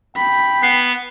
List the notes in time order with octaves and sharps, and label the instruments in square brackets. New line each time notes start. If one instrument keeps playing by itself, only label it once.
[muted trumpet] G5 [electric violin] B5
[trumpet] B3 [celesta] C7